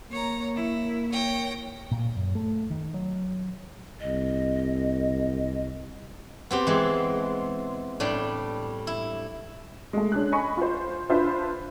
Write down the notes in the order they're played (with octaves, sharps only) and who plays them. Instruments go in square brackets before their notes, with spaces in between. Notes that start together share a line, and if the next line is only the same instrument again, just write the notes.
[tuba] A#3 [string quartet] C#5 A#5
[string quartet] E4
C#5 G5 A#6
[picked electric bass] A#2
F#2
A3
D#3
F#3
[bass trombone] C2 [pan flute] D#5
[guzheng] B3 C4 G4
E3 G#3
A2 G3 D4
E4
[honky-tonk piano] G#3 A3
C#4 D4 G#4 F#6
D#5 G#5 B5 C#6
F4 C5
D4 F4 B4 C5 E5 B5